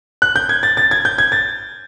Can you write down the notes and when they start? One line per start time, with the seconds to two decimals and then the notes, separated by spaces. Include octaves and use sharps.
0.22 F#6
0.36 G6
0.49 G#6
0.63 A6
0.77 A6
0.91 G#6
1.05 G6
1.18 G#6
1.32 A6